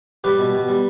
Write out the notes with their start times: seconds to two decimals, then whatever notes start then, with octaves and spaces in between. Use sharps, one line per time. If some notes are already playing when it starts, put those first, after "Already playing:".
0.24 G3 G4 B4
0.39 B2
0.55 B2
0.68 G3